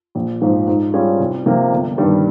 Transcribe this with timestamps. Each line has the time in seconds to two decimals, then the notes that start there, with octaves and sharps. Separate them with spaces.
0.15 A#1
0.42 G#2 F3
0.67 G#2
0.94 G3 C#4 F4 G#4
1.20 C2
1.46 C3 F3 A#3 F4
1.72 G1
1.98 G2 D#3 G3